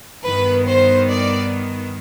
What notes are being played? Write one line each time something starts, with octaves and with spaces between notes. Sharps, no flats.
G2 D#3 B3 B4
C5
D5